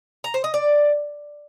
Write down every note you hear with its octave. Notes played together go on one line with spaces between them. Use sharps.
A#5
C5
D#5
D5